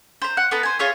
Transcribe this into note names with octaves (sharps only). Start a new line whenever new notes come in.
C5 A#5
F#5
B3 A4 B4 A#5
C5 G#5
F4 G#4 C#5 E5